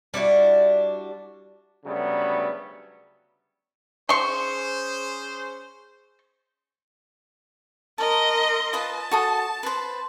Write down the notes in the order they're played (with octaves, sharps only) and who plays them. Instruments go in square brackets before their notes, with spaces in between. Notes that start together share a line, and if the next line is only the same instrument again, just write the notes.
[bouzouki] G3 D4 E4 F#4
[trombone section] D2 C#3 F#3 G3 A3 B3
[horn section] C#4 G#4 C5 [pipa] C6 C#6
[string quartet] A#4 D#5 C6 [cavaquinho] A5
[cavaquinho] F4 B4 D#5 [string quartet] A5
[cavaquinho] F#4 A4 D#6
B4 C5